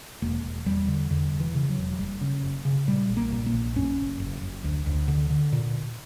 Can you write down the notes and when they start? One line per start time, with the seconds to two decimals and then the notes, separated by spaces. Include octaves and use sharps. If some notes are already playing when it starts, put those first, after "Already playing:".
0.22 E1 A#3
0.44 E1
0.66 E2 G3
0.88 D3
1.10 E2 D3
1.33 E1
1.40 E3
1.54 C#3
1.69 F#3
1.77 E1
1.99 F#1 G3
2.21 C#3
2.44 F#1
2.65 C#3
2.87 A#2 G3
3.09 A#1
3.17 A#3
3.32 A#2
3.46 A#3
3.53 A#1
3.76 F#2 C#4
3.98 F#1
4.20 F#1
4.41 F#1
4.64 D2
4.86 D2
5.08 D3
5.30 D3
5.52 A#2